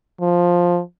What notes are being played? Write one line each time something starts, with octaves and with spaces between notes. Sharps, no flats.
F3